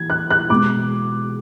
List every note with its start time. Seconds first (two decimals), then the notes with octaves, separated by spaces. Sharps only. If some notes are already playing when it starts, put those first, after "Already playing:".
Already playing: E3 G#6
0.10 F#6
0.30 F#6
0.50 B2 G#3 B3 D6